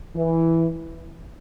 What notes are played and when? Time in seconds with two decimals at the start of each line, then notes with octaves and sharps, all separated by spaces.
0.15 E3